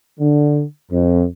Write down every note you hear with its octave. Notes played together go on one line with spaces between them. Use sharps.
D3
F2